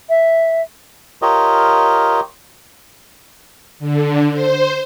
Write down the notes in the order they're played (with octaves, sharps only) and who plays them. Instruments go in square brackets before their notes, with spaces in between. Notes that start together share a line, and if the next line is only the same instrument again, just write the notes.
[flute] E5
[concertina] F4 G4 A#4 C#5 D#5
[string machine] D3
C5